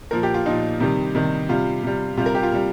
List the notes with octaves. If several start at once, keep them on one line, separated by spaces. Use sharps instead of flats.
A#2 F3 A#4
G4
F4
A#2 F3 D#4
C3 D#3 G3
C3 D#3 G3
C3 G3 F4
C3 G3
C3 G3 F4
A#4
G4
F4
C3 G3